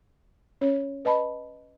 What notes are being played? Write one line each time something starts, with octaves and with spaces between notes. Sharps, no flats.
C#4 C#5
B4 D#5 A5 B5